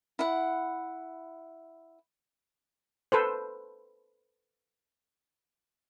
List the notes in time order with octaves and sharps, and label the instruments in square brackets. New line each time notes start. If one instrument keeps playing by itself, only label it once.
[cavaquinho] E4 F#5
[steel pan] A4 B4 C5